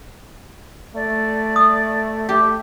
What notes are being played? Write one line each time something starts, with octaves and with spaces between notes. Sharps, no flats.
A3 D5
D#6
A3 G4